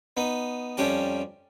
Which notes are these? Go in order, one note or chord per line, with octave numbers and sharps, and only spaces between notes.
B3 D#4
F2 G3 C#4 G4 A5